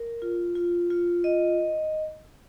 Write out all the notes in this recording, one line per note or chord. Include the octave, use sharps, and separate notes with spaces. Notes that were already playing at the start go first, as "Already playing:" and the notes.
Already playing: A#4
F4
F4
F4
D#5